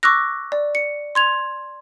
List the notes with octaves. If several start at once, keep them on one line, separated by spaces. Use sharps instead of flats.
C#6 D6 E6 F#6 A#6
D5
C#7
C6 G#6 F7